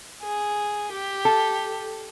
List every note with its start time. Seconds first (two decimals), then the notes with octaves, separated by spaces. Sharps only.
0.23 G#4
0.92 G4
1.25 A4